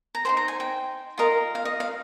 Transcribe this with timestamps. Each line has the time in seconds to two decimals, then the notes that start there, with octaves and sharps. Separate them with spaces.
0.15 A#5
0.25 D#4 G#4 C5 C6
0.37 A#5
0.48 G#5
0.60 G5
1.18 F4 A#4 D#5
1.55 F5
1.65 D#5
1.80 F5